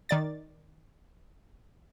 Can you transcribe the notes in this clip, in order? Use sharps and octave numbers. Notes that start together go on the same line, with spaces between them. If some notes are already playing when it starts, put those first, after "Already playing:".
D#3 D5 A6